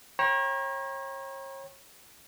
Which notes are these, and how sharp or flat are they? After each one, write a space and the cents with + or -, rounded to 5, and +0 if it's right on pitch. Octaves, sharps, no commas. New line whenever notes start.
C#5 -35 G5 +0 A#5 +35